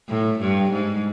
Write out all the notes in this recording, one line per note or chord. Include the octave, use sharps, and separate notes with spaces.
A2
G2
G#2